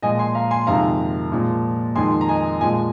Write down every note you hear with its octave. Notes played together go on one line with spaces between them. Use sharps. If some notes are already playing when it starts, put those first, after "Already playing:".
A#2 F3 G#3 D#5 G#5
G#5 C6
F5 A#5
G#5 C6
F2 C3 D#3 G#3 F5 A#5
A#2 F3 G#3
F2 D#3 G#3 G#5 C6
A#5
D#5 G#5
A#2 F3 G#3 D#5 G#5